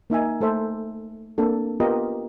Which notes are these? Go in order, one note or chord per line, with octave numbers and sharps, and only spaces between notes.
A#3 D#4 E5 G#5
A3 A4 C5 E5
A#3 C4 D4 A4
B3 F4 G4 A#4 D#5